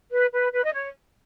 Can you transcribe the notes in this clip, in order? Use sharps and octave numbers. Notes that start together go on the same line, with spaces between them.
B4
B4
B4
D#5
C#5